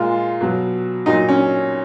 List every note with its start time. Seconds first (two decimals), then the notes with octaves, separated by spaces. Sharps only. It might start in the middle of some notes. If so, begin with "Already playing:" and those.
Already playing: A#2 G#3 F4
0.41 B2 F#3
1.06 A#2 F#3 D#4
1.29 C#4